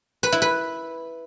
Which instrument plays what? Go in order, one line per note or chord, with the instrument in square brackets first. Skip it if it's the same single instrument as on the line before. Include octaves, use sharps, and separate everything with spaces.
[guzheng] B4
E4
B4